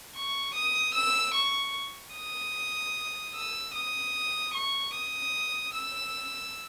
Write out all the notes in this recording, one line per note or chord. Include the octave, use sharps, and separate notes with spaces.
C#6
D#6
E6
C#6
D#6
E6
D#6
C#6
D#6
E6